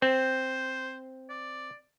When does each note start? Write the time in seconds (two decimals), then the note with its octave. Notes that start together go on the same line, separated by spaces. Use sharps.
0.02 C4 C5
1.30 D5